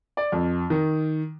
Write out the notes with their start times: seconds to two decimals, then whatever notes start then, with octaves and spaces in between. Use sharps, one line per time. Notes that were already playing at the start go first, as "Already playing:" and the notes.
0.17 D5
0.32 F2
0.70 D#3